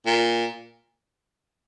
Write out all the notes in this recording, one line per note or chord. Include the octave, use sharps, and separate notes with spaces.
A#2